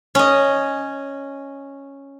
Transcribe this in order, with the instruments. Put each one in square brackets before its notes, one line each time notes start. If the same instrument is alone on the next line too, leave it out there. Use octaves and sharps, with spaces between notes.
[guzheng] C#4 D#5